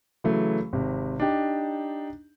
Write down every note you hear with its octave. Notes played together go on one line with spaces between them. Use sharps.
C#3 E3 F#3 A3
G#1 C3
D4 D#4 G4